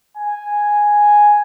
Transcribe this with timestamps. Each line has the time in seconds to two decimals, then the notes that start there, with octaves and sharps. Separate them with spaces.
0.17 G#5